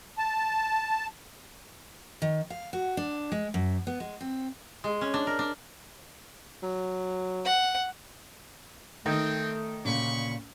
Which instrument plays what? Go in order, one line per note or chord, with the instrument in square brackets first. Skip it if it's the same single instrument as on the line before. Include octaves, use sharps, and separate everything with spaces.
[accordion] A5
[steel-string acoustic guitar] D#3
F5
F#4
D4
G#3
F#2
B3
G#3
C4
[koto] G#3
C#4
D4
A#4
D4
[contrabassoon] F#3
[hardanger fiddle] F#5
[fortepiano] D#3 [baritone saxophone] A3 [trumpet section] C4 D#5 G5
[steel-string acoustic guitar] D2 A#2 C#3 [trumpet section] B5 C#6